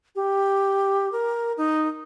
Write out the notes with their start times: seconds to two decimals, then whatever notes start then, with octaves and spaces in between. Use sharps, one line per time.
0.16 G4
1.12 A#4
1.57 D#4